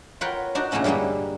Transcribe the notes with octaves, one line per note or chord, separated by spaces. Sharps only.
F4 A#4 B4 C#5 F#5 G5
D4 D#4 F#4 D5
A#2 C#3 A3 A#3 C#4 A#4
G2 D3 G3 G#3 A#3